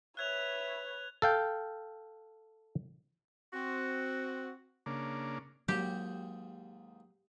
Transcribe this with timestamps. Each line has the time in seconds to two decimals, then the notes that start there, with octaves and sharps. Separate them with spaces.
0.17 B4 C#5 E5 F#6 G#6 F7
1.22 A4 F5 G5
3.54 C4 F#4
4.86 C#3 A#3 D4
5.68 D#2 G#2 F#3 F#4 G4